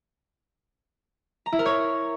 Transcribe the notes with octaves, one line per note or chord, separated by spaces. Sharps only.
A#5
E4
A#4
C#5